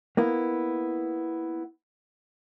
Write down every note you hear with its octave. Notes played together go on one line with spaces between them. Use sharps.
A#3 B3 E4